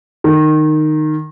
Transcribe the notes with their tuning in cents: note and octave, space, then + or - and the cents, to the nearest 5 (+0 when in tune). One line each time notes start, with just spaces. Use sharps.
D#3 -15